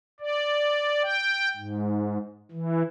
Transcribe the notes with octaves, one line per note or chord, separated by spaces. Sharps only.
D5
G5
G#2
E3